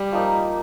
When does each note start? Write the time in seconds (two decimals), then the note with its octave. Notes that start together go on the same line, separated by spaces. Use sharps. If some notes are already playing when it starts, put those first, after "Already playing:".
Already playing: G3 G4
0.12 F3 A#3 D#4 A#4